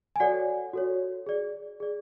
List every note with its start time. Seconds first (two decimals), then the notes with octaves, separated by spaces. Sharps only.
0.16 G#5
0.20 F#4 A4 C#5 D5 F#5
0.73 F#4 A4 C#5
1.26 G#4 D5
1.80 G#4 D5